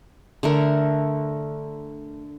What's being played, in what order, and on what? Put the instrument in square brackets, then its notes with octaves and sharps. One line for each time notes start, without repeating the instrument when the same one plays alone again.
[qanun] D3 A3 A#4